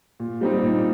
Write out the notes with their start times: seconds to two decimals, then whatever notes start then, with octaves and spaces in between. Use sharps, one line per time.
0.20 A#2
0.41 G3 C4 D#4
0.63 A#2